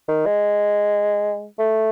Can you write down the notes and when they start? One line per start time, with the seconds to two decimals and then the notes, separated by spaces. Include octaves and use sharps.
0.08 D#3
0.26 G#3
1.59 A3